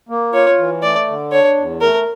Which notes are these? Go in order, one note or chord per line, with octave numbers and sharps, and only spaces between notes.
A#3
F4 C#5
E3
A3 D5
D3
D4 C#5
E2
A3 A#4